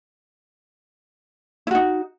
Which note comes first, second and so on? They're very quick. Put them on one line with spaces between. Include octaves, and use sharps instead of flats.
E4 F#4 D#4